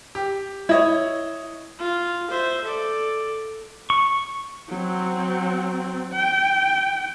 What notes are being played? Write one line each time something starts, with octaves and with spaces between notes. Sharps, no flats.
G4
E4 C#5 D#5 G#6
F4
C5 E5
A4 D5
C#6
F#3 C4
G5